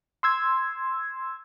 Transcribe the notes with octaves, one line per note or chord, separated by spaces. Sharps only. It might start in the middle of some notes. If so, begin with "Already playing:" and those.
C6 E6 G#6